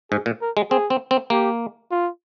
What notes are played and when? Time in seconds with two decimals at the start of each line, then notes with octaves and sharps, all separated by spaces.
0.11 G#2 G#4
0.26 A#2
0.41 A#4
0.57 G#3
0.70 C4 G#4
0.90 C4
1.11 C4
1.30 A#3 G4
1.91 F4